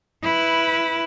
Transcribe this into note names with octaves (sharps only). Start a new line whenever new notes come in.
E4 B4